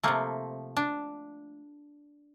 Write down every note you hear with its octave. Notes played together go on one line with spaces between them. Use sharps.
C3 F3 A3 A#3
D4